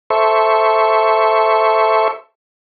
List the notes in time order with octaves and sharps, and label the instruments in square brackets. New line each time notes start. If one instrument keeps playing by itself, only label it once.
[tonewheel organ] A4 C5 E5 C#6